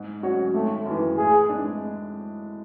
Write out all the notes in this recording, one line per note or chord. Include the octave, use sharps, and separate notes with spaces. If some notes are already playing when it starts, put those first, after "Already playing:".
Already playing: G#2
F#3 C#4 F#4 C#5
G#1 A3
F#2
E3
A2 G#4
G#3 D4